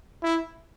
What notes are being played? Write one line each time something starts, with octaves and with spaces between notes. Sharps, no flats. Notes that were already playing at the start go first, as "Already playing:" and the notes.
E4